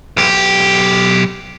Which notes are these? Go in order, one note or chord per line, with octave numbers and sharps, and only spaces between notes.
B1 G4